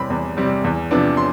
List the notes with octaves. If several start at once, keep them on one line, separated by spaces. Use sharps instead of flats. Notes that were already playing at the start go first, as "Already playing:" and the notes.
Already playing: E2 C3 G3 C4 B5
E2
C3 G3 C4
E2
C3 F3 B3 D4
C6